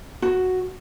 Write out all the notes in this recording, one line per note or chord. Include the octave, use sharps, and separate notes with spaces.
F#4